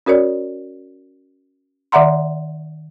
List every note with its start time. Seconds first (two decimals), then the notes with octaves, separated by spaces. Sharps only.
0.06 C#4 F#4 A#4 C#5 D5
1.92 D#3 D5 E5 F#5 A#5 C6